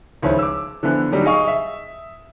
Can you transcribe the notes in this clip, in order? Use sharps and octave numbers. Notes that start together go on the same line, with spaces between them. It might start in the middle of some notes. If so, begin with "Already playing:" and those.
C#2 D#3 F3 C#4 E4
D6 E6
D3 E3 F3 B3
D3 F#3 G3 D#4
G#4 D#5 F5 C#6 D#6
E5